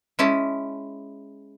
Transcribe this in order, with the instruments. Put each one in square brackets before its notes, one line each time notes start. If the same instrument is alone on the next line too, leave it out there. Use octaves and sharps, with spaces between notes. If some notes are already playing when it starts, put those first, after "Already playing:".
[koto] G#3 C#4 E4 A5